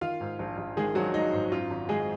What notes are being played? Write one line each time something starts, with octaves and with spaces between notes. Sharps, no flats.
D#3 F4 F5
G#2
A#1
A#1
D#3 G#3 G#4
A#1 F#3 F#4
G#3 D#4
G#2
F#2 F4
G#1
G#1 G#3 G#4